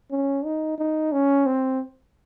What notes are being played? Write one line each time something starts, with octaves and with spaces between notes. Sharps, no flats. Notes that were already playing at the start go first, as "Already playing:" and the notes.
C#4
D#4
D#4
C#4
C4